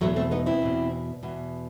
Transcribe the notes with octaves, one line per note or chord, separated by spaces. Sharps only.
E2 B2 F#3 A3
A3 C4
B3 D#4
C4 E4
E2 B2
E2 B2